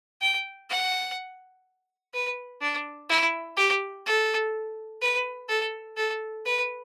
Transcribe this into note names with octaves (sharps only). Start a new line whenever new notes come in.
G5
F#5
B4
D4
E4
G4
A4
B4
A4
A4
B4